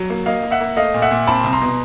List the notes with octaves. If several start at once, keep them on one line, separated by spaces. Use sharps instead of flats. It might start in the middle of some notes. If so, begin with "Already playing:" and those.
Already playing: F#3
A#3
A#3 D#5 F5
A#3
E5 F#5
A#3
A3 D#5 F5
A#2
E5 F#5
A#2
C4 A5 B5
C2
A#5 C6
B2